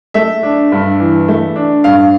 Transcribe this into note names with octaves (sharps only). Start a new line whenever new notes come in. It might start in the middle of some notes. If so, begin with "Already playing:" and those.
A3 E5
D4
G2
E3
A3
D4
G2 F5